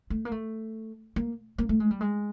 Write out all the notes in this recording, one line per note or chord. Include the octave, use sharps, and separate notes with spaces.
A3
A#3
A3
A#3
A#3
A3
G#3
G3
G#3